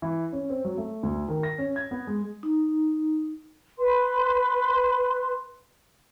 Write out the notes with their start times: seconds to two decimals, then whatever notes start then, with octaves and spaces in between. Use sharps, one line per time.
0.02 E3
0.33 C#4
0.49 C4
0.65 F#3
0.78 A3
1.03 D2
1.29 D#3
1.43 A#6
1.58 C#4
1.76 G#6
1.91 B3
2.07 G#3
2.43 D#4
3.79 B4 C6